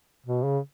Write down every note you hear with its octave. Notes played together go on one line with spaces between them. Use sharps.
B2
C#3